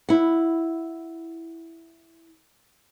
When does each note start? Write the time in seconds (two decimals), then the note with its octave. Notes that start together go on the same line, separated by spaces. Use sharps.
0.09 E4 F#5